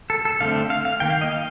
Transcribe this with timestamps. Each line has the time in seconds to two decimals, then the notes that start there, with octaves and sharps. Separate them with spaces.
0.10 A4
0.25 A4
0.40 D3 A3 C4 F5
0.70 F5
0.85 F5
1.00 D#3 A#3 G5
1.10 F5
1.21 D#5
1.31 F5